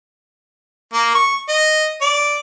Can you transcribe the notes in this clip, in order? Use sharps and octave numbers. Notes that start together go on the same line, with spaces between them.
A#3
C#6
D#5
D5